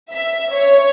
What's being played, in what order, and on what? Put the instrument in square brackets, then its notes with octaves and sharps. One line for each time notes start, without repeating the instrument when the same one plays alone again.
[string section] E5
C#5